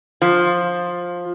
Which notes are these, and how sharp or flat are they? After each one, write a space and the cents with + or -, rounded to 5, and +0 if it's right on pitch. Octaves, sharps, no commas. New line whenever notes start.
F3 +10